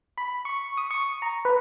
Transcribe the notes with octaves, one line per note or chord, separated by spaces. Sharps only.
B5
C#6
D#6
C#6
A#5
B4